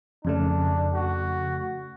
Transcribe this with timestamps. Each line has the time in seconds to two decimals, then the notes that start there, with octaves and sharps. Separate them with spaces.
0.25 F2 C#3 A3 D4
0.94 F#4